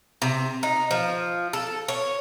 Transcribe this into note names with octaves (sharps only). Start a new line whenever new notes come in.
C3
D#4
F3
A4
C#5